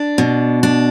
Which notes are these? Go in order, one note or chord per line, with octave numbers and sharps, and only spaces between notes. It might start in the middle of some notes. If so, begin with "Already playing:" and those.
Already playing: D4
B2
D4